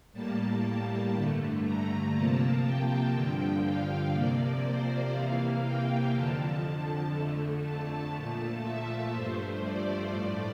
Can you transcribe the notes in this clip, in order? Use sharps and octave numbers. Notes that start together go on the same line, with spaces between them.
A2 G3 A#3 A5
G2 D3 A3
A#5
C3 F3 A#3 A5
G5
G2 D3 F3
F5
C3 F3 A#3 D5
C5
C3 E3 A#3 F5
G5
F2 D3 F3 A5
F2 D3 A3
A5
A#2 F3 A3 A5
E5
G2 F3 A3 C5
D5
A2 F3 A3 D5